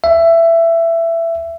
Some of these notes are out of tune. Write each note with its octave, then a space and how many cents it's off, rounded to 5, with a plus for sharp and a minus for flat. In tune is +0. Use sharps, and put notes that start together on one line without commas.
E5 +15